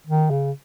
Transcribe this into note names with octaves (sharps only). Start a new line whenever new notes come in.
D#3
C#3